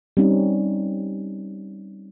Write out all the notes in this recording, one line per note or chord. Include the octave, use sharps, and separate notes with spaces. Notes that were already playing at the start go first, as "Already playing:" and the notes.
G3 C4 C#4 D#4